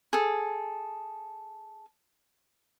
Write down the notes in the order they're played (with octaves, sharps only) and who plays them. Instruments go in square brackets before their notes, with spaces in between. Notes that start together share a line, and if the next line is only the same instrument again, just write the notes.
[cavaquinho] G#4 A4